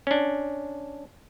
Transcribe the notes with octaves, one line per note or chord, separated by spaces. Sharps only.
C#4 D4